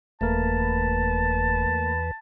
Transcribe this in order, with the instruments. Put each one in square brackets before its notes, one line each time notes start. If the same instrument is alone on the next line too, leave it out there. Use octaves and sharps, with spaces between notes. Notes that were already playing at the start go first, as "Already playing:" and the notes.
[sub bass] F1 [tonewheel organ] E2 B4 [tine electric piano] A3 A#3 A#4 [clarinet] A5